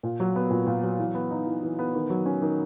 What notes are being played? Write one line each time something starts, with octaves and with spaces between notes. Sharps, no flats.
A#2
F#3
B3
A#2
A#2
F#3
E3
B3
D#4
E3
E3
B3
D#3
F#3
C#4
D#3